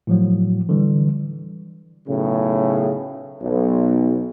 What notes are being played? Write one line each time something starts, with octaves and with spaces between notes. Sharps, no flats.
A2 F3 F#3
D3 E3 G3
B1 A2 C#3
B1